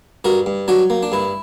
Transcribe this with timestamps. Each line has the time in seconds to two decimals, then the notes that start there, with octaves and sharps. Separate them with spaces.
0.24 G2 F#4 A#4
0.46 G2
0.68 F#3 D4 F#4
0.90 A#3
1.03 D4
1.12 G2 E4